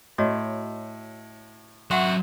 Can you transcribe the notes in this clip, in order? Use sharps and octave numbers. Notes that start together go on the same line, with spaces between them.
A2 F#4 C#5 D#5
F#3 F#4 E5 F#5 C6